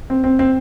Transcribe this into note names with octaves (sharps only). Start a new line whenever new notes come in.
C4
C4
C4